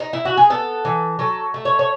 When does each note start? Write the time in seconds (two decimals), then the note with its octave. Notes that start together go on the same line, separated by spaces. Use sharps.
0.00 D#4
0.13 E4
0.25 F#4
0.37 G#4
0.50 B3 A4
0.85 E3
1.19 F#3 A4
1.54 A3
1.65 C#5
1.79 C#5